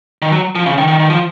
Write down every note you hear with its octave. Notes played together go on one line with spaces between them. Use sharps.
D#3
F#3
F3
C#3
D#3
D#3
D#3
F3